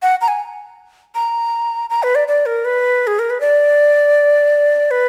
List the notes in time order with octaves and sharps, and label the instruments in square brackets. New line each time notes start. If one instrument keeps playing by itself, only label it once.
[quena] F#5
A#5
G#5
A#5
A#5
B4
D5
D5
A#4
B4
G#4
A#4
B4
D5
B4